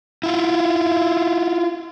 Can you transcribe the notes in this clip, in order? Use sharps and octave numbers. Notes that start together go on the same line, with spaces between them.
E4 F4